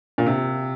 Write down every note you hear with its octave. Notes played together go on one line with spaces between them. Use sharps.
A#2
C3